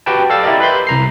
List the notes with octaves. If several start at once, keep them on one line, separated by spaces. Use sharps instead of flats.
F#4 G4 B4 G5 A5
A4 D5 F5 E6 A6
E4 G4 A#4 D5 D#5
B4 B5 C6 G6
C2 A#5 C7